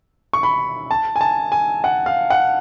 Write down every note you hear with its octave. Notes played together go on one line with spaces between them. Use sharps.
C#6
B5
A5
G#5
A5
G#5
F#5
F5
F#5